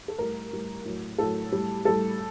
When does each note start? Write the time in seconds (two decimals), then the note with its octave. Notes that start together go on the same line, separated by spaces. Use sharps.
0.08 A4
0.19 A2 G3 A#4
0.52 A2 G3
0.85 A2 F#3
1.18 A2 F#3 A4
1.52 A2 G3
1.85 A2 G3 A4